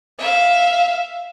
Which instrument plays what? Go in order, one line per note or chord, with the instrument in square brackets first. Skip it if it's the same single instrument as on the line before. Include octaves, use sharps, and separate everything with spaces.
[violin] E5 F5